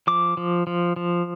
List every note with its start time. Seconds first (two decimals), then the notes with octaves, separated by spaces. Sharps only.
0.07 F3 D6
0.37 F3
0.67 F3
0.96 F3